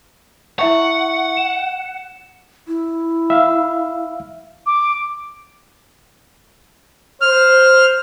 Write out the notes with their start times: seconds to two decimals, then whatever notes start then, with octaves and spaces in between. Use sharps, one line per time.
0.59 E4 E5 F#5 C#6
1.37 E7
2.68 E4
3.30 E5 F5
4.66 D6
7.22 C5 F6